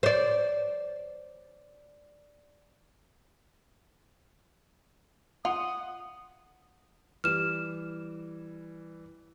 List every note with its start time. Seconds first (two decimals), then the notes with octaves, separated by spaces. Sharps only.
0.03 C5 D5
5.45 F4 F#5 D#6
7.24 E3 G3 F6 E7